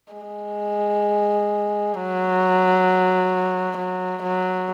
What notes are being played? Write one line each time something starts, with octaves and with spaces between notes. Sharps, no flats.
G#3
F#3
F#3
F#3